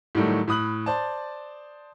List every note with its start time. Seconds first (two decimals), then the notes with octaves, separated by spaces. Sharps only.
0.15 A2 D#3 F#3 G3 A3
0.48 A2 B5 D#6 F#6 F#7
0.86 C5 D5 A5